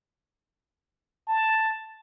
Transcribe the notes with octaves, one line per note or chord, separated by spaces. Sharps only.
A5